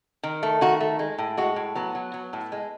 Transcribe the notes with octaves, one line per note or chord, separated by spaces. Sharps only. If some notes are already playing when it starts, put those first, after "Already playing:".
D#3
A3
D#3 F#4
A3
G#3
A2
G#3 F#4
A2
F#3 B3
F#3
F#3
A2
G#3